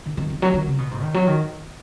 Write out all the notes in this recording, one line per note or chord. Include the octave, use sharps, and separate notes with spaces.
D#3
D#3
D#3
F#3
D#3
C#3
B2
G#2
D#3
F#3
D#3